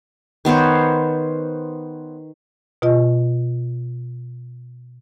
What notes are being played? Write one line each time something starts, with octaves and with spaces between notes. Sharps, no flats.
D#3 B3 C5 C#5
B2 F4 D#5